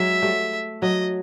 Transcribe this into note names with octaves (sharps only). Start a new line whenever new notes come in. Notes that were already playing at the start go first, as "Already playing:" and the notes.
Already playing: F#3 G#3 E5
G3 A3
F#3 D#5